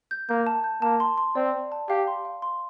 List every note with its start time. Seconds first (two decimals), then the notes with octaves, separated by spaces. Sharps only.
0.11 G6
0.29 A#3 G6
0.47 A5
0.64 G6
0.82 A#3 A5
1.00 C6
1.18 C6
1.35 C4 D5
1.54 D5
1.72 A5
1.89 G4 F5
2.07 C6
2.25 F5
2.42 C6